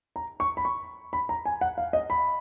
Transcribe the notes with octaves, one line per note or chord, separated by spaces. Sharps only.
A#5
C#6
B5
C#6
B5
A#5
G#5
F#5
F5
D#5
B5